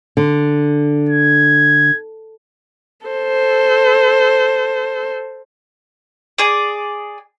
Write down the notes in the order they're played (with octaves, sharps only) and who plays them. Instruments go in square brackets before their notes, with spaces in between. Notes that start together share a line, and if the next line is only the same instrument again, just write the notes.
[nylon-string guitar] D3
[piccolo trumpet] G#6
[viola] A4 C5
[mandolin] G#4 D5